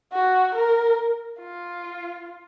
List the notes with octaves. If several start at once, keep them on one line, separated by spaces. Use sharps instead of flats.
F#4
A#4
F4